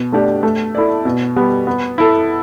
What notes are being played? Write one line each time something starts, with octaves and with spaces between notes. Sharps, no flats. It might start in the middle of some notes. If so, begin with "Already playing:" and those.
Already playing: B2
A3 D4 G4 D5
A3
E4 A4 D5
B2
G3 B3
B3
E4 A4